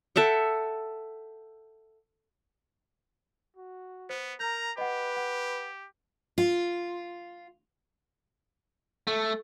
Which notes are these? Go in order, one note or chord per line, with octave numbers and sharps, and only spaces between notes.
A4 E5 F#5 G5
F#4
B3 C5
A#4 A#5 G6
G4 B4 D#5 F#5
F#5
F4
A3 A4